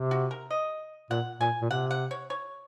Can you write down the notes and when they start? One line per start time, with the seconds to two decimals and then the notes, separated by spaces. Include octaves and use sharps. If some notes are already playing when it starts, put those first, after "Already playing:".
Already playing: C3
0.11 F#4
0.31 A#4
0.51 D#5
1.10 A#2 F#5
1.40 A#2 G#5
1.61 A#2
1.70 C3 F#5
1.91 F#5
2.11 C#5
2.30 C#5